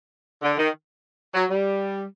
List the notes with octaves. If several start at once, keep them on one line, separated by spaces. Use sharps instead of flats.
D3
D#3
F#3
G3